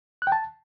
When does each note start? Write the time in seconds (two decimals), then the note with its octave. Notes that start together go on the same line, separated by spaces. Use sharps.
0.22 F#6
0.27 G5
0.32 A5